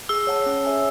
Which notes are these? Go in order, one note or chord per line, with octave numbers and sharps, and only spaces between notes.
G#4 E6
C#5 F#5 A5
C#4
G#4 C#5 E5 G#5